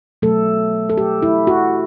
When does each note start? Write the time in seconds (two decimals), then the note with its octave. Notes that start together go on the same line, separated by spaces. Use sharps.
0.22 B2 F#3 A3 A4
0.90 A4
0.97 G4
1.22 E4
1.47 F#4